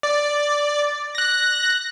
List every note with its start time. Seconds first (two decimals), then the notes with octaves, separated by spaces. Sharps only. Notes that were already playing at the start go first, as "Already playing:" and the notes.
0.03 D5
1.15 F#6 A#6